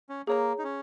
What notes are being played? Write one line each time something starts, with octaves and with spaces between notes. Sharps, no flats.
C#4
A#3 G#4 C#5 A#5
D#4
C#4